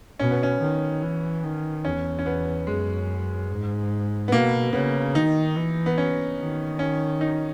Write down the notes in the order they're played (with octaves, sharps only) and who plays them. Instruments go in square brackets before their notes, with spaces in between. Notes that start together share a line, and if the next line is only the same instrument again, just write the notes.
[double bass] B2 [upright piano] C#4
[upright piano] B3
C#4
[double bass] D#3
E3
D#3
[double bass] E2 [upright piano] C#4
[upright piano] C#4
B3
[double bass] F#2 [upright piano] G#3
[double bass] G#2
[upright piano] B3
[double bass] B2 [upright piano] A#3
[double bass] C#3 [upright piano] B3
[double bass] D#3 [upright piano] D#4
[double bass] E3
[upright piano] B3
C#4
[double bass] D#3
[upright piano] C#4
D#4